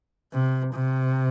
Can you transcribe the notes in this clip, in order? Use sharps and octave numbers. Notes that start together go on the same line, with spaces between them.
C3
C3